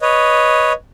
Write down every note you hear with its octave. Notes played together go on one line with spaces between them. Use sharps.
B4 C#5 D#5